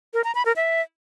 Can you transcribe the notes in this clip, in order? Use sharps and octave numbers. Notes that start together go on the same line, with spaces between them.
A#4
A#5
B5
A#4
E5